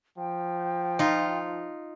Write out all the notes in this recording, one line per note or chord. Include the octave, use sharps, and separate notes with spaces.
F3 G5
D#4 F4